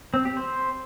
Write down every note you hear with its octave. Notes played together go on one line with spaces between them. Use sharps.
C4
G4
C5